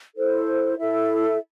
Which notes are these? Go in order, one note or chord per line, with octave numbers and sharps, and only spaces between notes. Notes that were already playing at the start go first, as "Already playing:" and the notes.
E4 A4 C5
E4 A4 E5